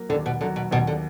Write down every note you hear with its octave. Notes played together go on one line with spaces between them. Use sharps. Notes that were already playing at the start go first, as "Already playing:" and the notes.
Already playing: F#3 A#3
D#2 D3
B2
D3 F#3
B2
D#2 B2
D3